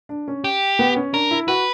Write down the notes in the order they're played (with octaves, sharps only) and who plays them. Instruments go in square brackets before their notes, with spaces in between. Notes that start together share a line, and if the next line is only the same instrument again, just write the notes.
[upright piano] D4
C#4
[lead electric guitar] G4
[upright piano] B3
C#4
[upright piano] D4 [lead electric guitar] A#4
[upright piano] E4
[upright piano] F#4 [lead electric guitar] B4